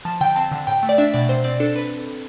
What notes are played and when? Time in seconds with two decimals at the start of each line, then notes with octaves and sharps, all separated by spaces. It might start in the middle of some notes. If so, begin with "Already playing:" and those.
0.05 F3 A5
0.21 D3 G5
0.36 C4 A5
0.51 D3
0.67 A2 G5
0.83 A3
0.89 D5
0.98 D4 E5
1.14 B2 D5
1.29 C3 C5
1.44 C4 D5
1.60 D4 A4
1.75 D4 B4